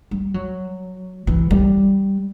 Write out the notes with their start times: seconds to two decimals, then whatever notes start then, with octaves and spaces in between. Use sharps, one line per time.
0.11 G3
0.34 F#3
1.27 E3
1.51 G3